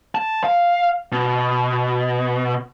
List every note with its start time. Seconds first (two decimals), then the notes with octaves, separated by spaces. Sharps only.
0.15 A5
0.44 F5
1.12 B2